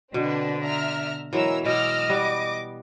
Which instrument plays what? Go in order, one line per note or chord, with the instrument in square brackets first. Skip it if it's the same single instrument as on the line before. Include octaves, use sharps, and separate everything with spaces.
[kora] B2 [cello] D3 [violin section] C4 D4 B4
[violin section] E5 A#5 F6
[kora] E3 F#3 G#3 [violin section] A#4 A#5 E6
[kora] B2 [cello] D#5 [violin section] D6 E6 F6
[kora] G3 B3 [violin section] D6